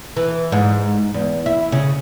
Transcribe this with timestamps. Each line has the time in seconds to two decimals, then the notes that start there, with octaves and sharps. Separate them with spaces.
0.16 E3
0.52 G#2
1.14 E2
1.46 E4
1.72 C#3